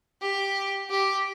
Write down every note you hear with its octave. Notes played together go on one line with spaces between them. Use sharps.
G4
G4